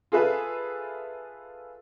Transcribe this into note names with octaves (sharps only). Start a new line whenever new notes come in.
F4 G#4 A4 B4 E5